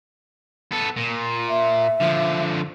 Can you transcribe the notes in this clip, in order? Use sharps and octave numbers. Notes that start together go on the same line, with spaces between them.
B3 A4
A#2
E5
D3 F3